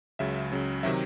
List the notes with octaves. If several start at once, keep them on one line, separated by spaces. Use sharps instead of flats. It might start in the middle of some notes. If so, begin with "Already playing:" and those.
C#2 C#3 F#3 E5
C#2 C#3 F#3
C3 D#3 F#3 E5